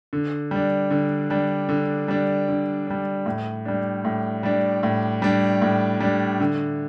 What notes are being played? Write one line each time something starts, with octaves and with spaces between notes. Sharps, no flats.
D3
G3 D4
D3
G3 D4
D3
G3 D4
D3
G3 D4
A2
G3 D4
A2
G3 D4
A2
G3 D4
A2
G3 D4
D3